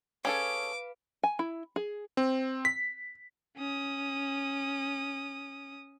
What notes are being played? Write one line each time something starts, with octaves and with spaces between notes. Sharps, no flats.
C#4 G#4 A4 B4 F5 D6
G#5
E4
G#4
C4
B6
C#4 D#6